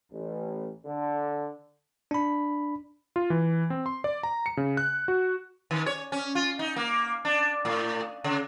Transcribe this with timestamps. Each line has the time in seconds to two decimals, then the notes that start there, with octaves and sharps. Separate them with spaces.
0.12 A1
0.86 D3
2.11 D4 B5
3.16 F4
3.30 E3
3.70 C4
3.86 C6
4.04 D5
4.23 A#5
4.46 C#7
4.57 C#3
4.77 F#6
5.08 F#4
5.71 D#3
5.86 C#5
6.12 C#4
6.35 F4
6.59 D#4
6.76 A#3
7.25 D4
7.65 A2
8.24 C#3